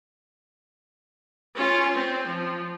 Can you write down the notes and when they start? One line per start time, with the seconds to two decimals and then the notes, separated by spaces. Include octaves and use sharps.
1.55 C#4 F4
1.96 C4
2.27 F3